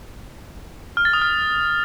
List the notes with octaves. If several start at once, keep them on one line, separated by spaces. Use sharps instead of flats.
F6
A6
D#6
F6